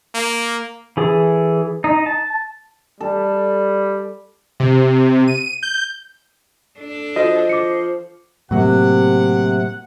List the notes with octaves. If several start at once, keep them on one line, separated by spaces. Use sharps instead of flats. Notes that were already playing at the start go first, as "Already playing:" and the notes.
A#3
E3 G#4 A4
D#4
A5
G3 A4
C3
D#7
G6
D4 A4
F3 F#4 D#5
D6 C#7
A2 C3 F#3 A#3 F#5